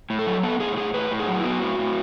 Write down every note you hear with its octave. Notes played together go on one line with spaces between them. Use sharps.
A2
A4
F#3
B3 A4
A2 G#4
A2 G#4
A2 B4
A2
G#4
F#3
E4
B3 F#4
A2
A2